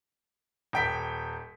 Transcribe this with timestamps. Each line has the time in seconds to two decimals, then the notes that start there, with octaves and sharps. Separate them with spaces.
0.73 D#1 G5 B6